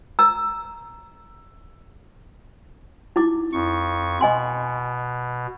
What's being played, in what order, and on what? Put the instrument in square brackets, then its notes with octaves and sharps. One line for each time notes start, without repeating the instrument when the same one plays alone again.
[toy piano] A#5 E6
D#4 E4 D6
[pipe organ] F2 C#6
[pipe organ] B2 [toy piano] D#5 G#5 C6